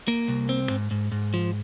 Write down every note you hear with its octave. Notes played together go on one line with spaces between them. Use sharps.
A#3
C2
C4
G#2
G#2
G#2
F3